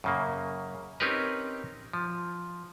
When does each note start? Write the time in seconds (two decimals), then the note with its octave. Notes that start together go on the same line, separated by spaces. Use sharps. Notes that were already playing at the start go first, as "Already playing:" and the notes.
0.04 F#2 C#3 A#3
1.00 C4 C#4 D#4 G4 A#4 B4
1.93 F3